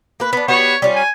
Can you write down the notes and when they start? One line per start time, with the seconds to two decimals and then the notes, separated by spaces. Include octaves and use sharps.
0.20 A#3 B4
0.33 B3 D4
0.48 B3 F#4 G4 C#5
0.82 G3 C#4 F4
0.95 G#5